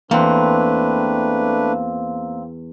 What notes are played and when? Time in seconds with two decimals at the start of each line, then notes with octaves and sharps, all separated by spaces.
0.11 E2 A3 A#3 C4 D4 B4